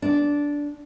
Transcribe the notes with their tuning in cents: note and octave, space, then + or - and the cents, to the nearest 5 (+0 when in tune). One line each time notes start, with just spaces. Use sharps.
D4 -10